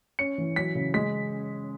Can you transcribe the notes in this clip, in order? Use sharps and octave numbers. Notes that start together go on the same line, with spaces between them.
C#4 C#7
E3
F#3 B6
C#3
G#3 B6